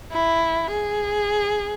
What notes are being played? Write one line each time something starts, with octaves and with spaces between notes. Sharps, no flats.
E4
G#4